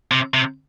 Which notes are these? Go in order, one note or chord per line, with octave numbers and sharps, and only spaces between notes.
C3
C3